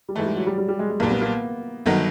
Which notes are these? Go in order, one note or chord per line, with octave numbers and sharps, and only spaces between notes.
G3
G#2 E3 G#3 A3
G3
F#3
G3
G3
G3
G#3
G#3
B1 A#2 G3 A#3
B3
A#3
G1 D#3 F#3 B3